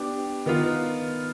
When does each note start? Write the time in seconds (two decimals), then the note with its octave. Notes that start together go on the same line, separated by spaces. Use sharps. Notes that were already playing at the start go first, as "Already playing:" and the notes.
Already playing: B3 D4 G4
0.46 D#3 B3 F4